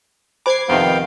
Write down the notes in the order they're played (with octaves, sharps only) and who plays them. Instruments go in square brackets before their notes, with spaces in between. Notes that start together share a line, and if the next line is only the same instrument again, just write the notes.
[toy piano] C5 B5 [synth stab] D6 G#6 C7
[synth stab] F2 C3 D#3 [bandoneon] B3 F5 G5